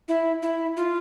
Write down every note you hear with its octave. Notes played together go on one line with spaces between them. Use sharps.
E4
E4
F4